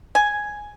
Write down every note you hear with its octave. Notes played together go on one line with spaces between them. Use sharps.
G#5